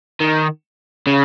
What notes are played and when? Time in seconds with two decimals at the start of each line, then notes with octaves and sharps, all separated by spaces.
0.20 D#3
1.07 C#3